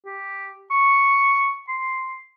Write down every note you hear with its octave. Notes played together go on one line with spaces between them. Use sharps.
G4
C#6
C6